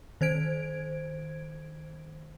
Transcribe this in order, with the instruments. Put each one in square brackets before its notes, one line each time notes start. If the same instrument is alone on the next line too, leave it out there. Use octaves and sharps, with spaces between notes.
[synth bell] D#3 C5 G#6 D7